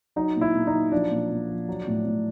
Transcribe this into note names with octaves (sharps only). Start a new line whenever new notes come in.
F#3 D#4
A#2
E4
A#2
D#4
F#3
F3 D4
A#2
A#2
F3
F#3
A2
A2